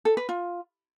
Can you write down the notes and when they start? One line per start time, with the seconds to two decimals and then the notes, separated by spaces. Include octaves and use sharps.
0.05 A4
0.17 B4
0.29 F4